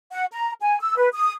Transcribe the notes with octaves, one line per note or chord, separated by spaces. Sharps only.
F#5
A#5
G#5
E6
B4
D#6